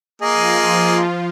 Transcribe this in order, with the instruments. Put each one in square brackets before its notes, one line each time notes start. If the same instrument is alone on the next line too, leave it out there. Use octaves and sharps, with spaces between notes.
[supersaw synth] F3 F4 [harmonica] A#3 G#4 D#5